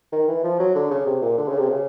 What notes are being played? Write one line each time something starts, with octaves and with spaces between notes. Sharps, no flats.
D#3
E3
F3
F#3
D3
C#3
C3
A#2
D3
C#3
C3
C#3